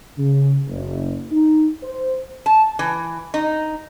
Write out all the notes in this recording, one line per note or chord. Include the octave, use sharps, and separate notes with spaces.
C#3
F#1
D#4
C5
A5
E3
D#4